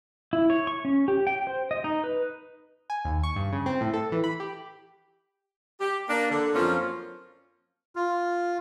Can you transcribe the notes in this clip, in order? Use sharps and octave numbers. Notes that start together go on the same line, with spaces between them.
E4
C#5
C#6
C#4
G4
G5
C5
D#5
D#4
B4
G#5
D#2
C#6
G2
C#3
C4
A2
A4
E3
B5
G4
G4
A#3 D4
D3
F#2 F3 A#3 C4 C#4 F4
F4